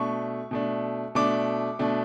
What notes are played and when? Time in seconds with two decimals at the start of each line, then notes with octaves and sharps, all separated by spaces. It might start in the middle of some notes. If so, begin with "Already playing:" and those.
Already playing: B2 A3 D4 C#6
0.51 B2 A3 D4
1.15 B2 A3 D4 D6
1.79 B2 A3 D4